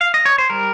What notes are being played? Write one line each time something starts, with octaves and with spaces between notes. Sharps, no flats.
F5
D#5
C#5
C5
G3 A#4